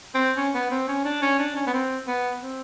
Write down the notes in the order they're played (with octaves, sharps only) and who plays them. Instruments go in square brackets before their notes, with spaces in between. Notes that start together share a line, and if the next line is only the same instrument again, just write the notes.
[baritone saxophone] C4
C#4
B3
C4
C#4
D4
C#4
D4
C#4
B3
C4
B3
C4